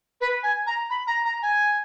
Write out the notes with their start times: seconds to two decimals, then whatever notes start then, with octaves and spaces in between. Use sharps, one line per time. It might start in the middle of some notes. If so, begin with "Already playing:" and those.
0.21 B4
0.43 G#5
0.67 A#5
0.90 B5
1.07 A#5
1.25 A#5
1.42 G#5